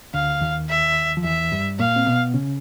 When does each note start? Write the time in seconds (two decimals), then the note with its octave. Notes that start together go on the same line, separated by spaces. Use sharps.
0.14 D2 D3 F5
0.41 D#2 D#3
0.69 E5
1.17 F3
1.24 E2 E3 E5
1.52 G2 G3
1.79 A#2 A#3 F5
1.96 C4
2.06 B2 B3
2.34 C#3 C#4